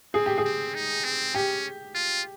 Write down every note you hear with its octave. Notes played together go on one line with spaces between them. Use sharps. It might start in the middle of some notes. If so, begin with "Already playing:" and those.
C4 G#4
G4
G#4
C4
D#4
C4
C#4 G4
F4